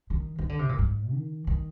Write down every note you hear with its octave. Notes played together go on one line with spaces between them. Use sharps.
D#3
D#3
D3
C3
A#2
G#2
D#3
D#3